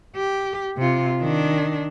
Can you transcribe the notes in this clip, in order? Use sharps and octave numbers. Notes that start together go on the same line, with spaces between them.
G4
C3 F4
D#3 D4